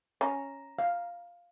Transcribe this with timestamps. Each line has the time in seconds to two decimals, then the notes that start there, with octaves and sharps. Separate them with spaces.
0.21 C#4 A#5
0.79 F5